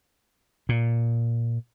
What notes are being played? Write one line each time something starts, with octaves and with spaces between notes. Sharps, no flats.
A#2